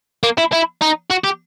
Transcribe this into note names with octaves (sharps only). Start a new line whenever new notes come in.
A#3
E4
E4
D#4
F#4
G4